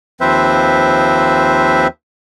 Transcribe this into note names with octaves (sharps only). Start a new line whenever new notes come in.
D#2 F3 C4 B4 C5 E5